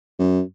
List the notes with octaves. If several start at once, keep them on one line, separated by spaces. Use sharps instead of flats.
F#2